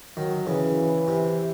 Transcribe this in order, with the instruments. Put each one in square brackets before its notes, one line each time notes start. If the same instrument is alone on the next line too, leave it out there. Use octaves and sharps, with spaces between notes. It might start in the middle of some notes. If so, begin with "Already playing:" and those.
[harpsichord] D#3 [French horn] F#3
[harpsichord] C#3 [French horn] E3
[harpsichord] C3